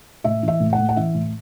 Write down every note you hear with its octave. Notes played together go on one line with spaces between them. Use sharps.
A2 E5
E3
E5
A2
F#5
A2
F#5
E3 E5
A2